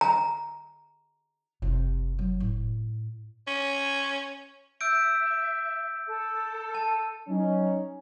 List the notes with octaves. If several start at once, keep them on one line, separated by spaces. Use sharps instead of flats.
A#5
F#1 C3
F#3
A2
C#4
E5 E6 G6 D7
A4
A5
F#3 C#4 D#4